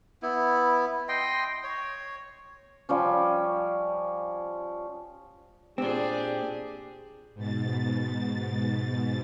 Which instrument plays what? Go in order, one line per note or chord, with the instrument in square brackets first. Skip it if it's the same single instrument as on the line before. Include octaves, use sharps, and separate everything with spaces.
[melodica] B3 E4
D#5 G5 C6
C#5
[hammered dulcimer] F3 G3 C#4
[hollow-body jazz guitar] A#2 C4 [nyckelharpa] D4 G#4 [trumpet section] G4
[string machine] G#2 B2 A6